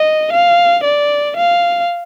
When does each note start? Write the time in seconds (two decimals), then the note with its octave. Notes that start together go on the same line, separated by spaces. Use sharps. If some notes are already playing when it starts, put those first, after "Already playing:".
Already playing: D#5
0.33 F5
0.85 D5
1.36 F5